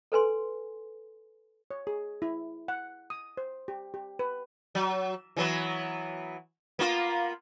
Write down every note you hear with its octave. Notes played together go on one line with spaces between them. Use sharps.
A4 B4 G#5 C6
C#5
G#4
E4
F#5
D#6
C5
G4
G4
B4
F#3
E3 F#3 B3
A#3 B3 F4